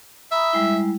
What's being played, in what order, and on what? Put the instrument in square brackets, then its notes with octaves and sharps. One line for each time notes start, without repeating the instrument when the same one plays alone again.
[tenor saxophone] E5 [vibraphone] A#5 B5 D#6
[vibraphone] G3 G#3 E4